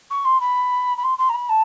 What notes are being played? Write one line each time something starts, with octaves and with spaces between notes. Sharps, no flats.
C#6
C6
B5
B5
C6
C6
A#5
B5
A5